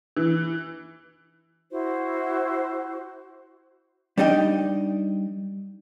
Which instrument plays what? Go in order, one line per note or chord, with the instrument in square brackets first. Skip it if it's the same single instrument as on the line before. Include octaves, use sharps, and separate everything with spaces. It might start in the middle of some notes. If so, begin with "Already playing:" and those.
[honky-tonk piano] E3
[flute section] E4 F#4 C5
[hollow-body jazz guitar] G3 D4 D#4 D#5 G5